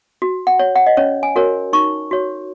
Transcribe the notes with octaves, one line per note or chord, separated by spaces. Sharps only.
F#4
F#5
C#5
F#5
D#5
C#4 C#5
G#5
F#4 A#4 C#5
D#4 C#6
F#4 C#5